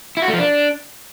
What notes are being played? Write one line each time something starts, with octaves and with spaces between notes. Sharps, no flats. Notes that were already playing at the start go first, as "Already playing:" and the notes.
E4
F#4
A3
F3
D4